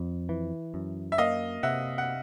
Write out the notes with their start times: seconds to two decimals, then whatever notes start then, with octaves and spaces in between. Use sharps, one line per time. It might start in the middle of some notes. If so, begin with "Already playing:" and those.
Already playing: F2
0.29 E3
0.74 F#2
1.12 E5
1.18 A#3 D#5 F5
1.63 C3 E5 F#5
1.98 F#5